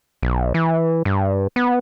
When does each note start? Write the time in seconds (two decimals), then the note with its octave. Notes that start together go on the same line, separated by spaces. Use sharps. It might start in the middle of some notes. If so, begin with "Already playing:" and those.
0.23 B1
0.54 E3
1.05 G2
1.56 B3